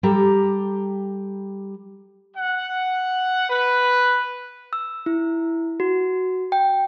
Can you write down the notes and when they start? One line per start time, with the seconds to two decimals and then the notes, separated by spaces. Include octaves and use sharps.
0.03 G3 G4 A4 A#5
2.37 F#5
3.50 B4
4.73 E6
5.06 E4
5.80 F#4
6.52 G5